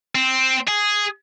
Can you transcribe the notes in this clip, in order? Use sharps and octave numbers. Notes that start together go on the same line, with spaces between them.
C4
G#4